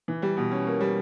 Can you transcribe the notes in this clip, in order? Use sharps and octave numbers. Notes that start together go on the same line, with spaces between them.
E3
G3
B2
C#4
A#3
G3